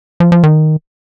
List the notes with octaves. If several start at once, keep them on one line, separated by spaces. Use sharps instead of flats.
F3
F3
D#3